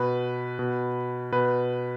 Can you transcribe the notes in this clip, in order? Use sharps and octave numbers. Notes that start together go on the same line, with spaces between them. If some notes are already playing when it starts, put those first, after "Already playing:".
Already playing: B2 B4
B2
B2 B4